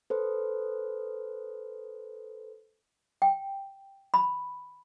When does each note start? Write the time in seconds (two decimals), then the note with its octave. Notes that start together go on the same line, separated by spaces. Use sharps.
0.10 A4 B4 C5
3.22 G5
4.14 B5